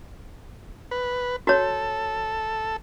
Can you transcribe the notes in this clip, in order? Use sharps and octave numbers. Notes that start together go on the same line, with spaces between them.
B4
F#4 A4 C#5